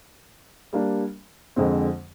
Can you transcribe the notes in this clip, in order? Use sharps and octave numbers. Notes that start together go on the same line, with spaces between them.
G3 A#3 D4
F2 D3 G#3 C4